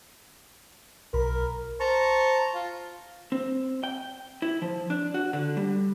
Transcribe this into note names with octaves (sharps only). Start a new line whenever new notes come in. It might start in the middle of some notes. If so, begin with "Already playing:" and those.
B1 A#4 B5
C5 A5 A#5 C#6
F4
C4
G5
E4
F3
D4
F#4
D3
G3